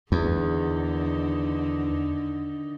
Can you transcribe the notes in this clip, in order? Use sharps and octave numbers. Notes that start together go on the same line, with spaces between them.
E2 D3 D#3 D#4